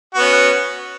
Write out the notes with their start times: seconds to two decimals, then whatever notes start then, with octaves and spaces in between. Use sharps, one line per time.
0.15 F#4
0.18 B3
0.21 C#4